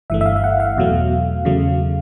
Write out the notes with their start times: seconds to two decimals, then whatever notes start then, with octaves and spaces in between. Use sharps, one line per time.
0.10 G1 G2 E3 A3 E5
0.21 E5
0.26 F5
0.36 F5
0.44 F#5
0.60 F5
0.77 E2 B2 F#3 A3
1.45 E2 C#3 F#3 A3